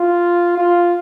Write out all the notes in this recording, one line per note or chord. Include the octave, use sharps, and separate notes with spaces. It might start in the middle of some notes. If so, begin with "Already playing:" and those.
Already playing: F4
F4